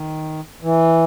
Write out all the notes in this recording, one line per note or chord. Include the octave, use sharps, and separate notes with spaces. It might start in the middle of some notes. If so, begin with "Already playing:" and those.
Already playing: D#3
E3